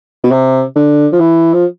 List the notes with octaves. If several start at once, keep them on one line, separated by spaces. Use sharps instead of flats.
B2
C3
D3
F3
E3
F3